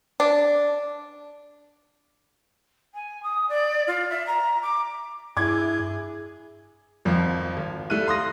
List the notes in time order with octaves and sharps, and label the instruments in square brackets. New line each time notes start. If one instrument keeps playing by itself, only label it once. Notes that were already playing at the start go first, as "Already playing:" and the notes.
[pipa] D4
[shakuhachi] G#5
D#6
D5
F4
E5
A#5
D6
[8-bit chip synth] G2 [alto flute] E4 [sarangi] G#4 [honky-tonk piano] D6 G#6
[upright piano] G#1 F2 F3
G#1
G3 A3 E4 F#6 D#7
F5 C6 D#6 A#6